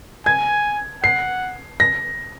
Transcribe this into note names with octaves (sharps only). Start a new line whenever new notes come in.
G#5 G#6
F#5 C7
A#6